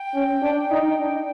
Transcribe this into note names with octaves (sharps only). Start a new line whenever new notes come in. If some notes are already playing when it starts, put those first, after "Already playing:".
Already playing: G5
C#4
D4
D#4
D4